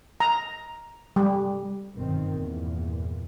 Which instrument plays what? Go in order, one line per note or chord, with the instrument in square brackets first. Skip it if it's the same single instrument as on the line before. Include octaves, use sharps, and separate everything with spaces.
[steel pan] A#5
G3
[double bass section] G1 F#2 B2 D#3 C4
E2 G2 A#2